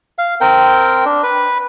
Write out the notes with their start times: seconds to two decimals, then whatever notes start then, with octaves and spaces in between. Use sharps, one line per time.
0.18 F5
0.41 C4 A#4 G5
1.05 D4
1.23 B4